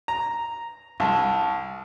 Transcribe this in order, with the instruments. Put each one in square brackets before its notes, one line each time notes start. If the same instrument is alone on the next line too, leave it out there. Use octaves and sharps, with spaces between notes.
[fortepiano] A#5
[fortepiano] C2 [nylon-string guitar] A5